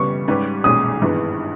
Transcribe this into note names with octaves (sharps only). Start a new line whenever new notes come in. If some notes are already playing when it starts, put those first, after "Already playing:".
Already playing: C#3 G3 B3 C#6
G#2 G3 C#4 G4 B4
B1 A#2 G#3 C#4 D#6
G#1 G2 E3 G#3 B3